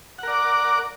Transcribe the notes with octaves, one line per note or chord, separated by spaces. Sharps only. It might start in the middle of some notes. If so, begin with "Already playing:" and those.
A#4 D5 F#5 D6